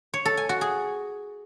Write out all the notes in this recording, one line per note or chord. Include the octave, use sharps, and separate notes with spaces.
C#5
A4
G#5
F#4
G#4